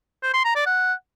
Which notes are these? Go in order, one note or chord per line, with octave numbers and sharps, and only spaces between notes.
C5
C6
A#5
D5
F#5